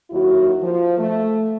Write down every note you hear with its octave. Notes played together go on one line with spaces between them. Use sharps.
D#2 D#3 F#3 E4 F#4
F3
A3